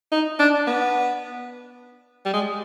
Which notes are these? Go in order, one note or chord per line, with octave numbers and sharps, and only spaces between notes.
D#4
D4
B3
G3
G#3